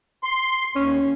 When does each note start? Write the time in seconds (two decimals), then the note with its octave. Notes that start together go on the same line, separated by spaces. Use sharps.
0.23 C6
0.75 D#2 C#4